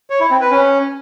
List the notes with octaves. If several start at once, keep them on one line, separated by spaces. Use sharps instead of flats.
C#5
E4
C4
B4
C#4